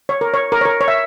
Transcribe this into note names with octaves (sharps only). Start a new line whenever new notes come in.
C#5
A#4
C#5
A#4
C#5
A#4
C#5
E5